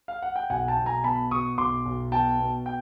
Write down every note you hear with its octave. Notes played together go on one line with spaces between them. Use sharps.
F5
F#5
G5
B1 F#5 G#5
G5 A5
B1
G#5 A#5
B2 A5 B5
B2 C#6 D#6
B1 C6 D6
B1
B2 G5 A5
B2
G5